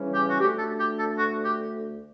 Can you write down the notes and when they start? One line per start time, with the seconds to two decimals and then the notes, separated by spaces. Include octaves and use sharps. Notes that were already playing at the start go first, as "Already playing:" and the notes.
Already playing: C#3 E3 G3 C#4
0.13 G4
0.30 F#4
0.40 D2 D3 A3 G4
0.59 A4
0.79 G4
0.99 A4
1.18 F#4
1.44 G4